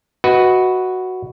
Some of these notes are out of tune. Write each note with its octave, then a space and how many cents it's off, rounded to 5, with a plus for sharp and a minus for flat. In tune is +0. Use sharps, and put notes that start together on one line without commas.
F#4 +0 B4 +0 D#5 +25